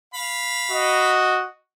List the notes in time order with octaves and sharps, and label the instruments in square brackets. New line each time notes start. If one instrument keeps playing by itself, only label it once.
[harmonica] F5 B5
[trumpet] F#4 [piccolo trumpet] D#5